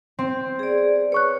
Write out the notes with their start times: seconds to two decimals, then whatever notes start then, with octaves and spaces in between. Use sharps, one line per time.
0.19 C4
0.59 G#4 D5
1.12 B4 C#5 C#6 F#6